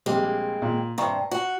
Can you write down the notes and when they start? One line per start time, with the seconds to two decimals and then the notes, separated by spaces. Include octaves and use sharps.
0.06 A#1 C3 G3 G#3 A#3 C4
0.62 A#2
0.98 G2 C3 F5 A#5 C#6
1.31 F#4